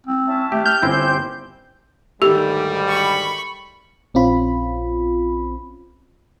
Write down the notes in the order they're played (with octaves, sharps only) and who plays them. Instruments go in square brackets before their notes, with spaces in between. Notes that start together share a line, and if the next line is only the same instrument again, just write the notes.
[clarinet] C4
[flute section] C#4 E4 A5
[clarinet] A3 [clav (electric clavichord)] G4
[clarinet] F6 [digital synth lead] G6
[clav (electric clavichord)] G1 C4 E4 [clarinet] C#4 [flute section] G4 C5
[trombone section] D2 G#2 G3 [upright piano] D#3 A3 [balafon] G4
[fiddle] B5 C#6
[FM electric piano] A#1 C4 C#4 F4 B5